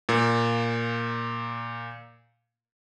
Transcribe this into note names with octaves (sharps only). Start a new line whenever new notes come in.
A#2 A#3